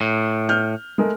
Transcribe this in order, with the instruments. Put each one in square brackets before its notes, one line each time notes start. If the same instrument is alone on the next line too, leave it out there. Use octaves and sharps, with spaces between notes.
[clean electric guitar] A2
[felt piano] F6 G6
G#3 A3 A#4